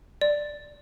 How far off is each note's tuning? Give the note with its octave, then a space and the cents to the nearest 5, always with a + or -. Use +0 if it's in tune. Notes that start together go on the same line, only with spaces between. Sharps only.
D5 +5